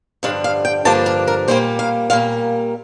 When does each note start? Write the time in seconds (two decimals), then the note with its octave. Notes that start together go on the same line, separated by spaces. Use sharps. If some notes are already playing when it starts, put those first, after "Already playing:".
0.23 G2 D3 F3 D4 F5
0.44 F5
0.65 G5
0.85 G2 D3 F3 A#3 D4 A5
1.06 A#4
1.28 A#4
1.48 A#2 G3 A#3 C5
1.79 F5
2.10 A#2 G3 A#3 F5